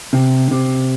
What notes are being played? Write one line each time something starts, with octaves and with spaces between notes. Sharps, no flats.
C3
C3